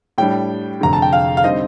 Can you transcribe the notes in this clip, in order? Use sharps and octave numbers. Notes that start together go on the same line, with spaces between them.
A2 G3 D4 G5
F1 F2 D3 A#5
A5
G5
F5
F5
D3 G3 C4 D#4 D#5